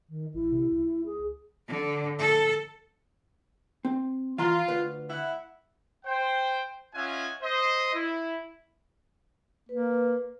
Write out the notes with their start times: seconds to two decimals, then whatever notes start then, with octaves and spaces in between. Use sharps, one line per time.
0.09 D#3
0.34 A1 E4
0.52 C3
0.72 C#2
1.06 G#4
1.68 D3
2.19 A4
3.85 C4
4.38 E3 F4 A#5 C6
4.68 D2 B4
5.10 E4 F#5
6.06 C5 G5
6.94 C#4 F4 D#5 E5 F#5 G#5
7.42 C5 D#5
7.94 E4
9.69 A#3 B4